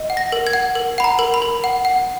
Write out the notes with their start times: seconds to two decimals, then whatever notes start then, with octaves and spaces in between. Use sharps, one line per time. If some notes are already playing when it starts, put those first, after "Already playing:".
Already playing: D#5
0.10 F#5
0.17 A#6
0.32 A#4
0.47 G#6
0.53 F#5
0.75 A#4
0.98 F#5 B5
1.04 A#5
1.19 A#4
1.34 B5
1.42 A#4
1.64 F#5
1.85 F#5